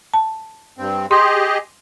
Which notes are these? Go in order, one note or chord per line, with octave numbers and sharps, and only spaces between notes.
A5
G2 C4
G4 G#4 D#5 C6